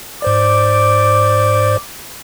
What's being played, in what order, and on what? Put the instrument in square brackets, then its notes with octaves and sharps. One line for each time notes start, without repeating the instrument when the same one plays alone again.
[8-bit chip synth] G#2 C5 D5 [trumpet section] D6